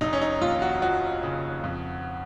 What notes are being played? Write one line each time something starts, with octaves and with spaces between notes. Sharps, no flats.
F1 D#4
C#4
D#4
D#2 F4
F#4
F3 F#4
C#3
F2